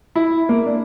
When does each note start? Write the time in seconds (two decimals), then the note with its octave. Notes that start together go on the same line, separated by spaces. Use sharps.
0.16 E4
0.49 A#3
0.66 D4